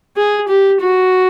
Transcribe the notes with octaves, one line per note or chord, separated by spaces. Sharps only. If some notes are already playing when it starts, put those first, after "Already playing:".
G#4
G4
F#4